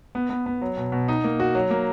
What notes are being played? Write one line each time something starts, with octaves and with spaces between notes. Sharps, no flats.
B3
B3
B3
F#3
B2
B2
D#4
A#3
F#4
F#3
A#3